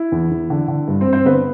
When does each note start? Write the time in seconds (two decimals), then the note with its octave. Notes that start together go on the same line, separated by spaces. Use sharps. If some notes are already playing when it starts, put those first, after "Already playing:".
Already playing: E4
0.12 E2
0.31 E2
0.50 D3
0.68 D3
0.88 G2
1.01 C4 C5
1.07 G2
1.13 C4 C5
1.25 D3 B3 B4